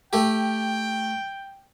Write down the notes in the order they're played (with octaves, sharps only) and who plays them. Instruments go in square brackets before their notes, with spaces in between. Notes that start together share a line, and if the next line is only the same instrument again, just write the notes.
[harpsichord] A3 G4 [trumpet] G5